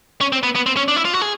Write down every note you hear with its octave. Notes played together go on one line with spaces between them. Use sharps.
C#4
C4
B3
B3
C4
C#4
D4
E4
F4
F#4
G#4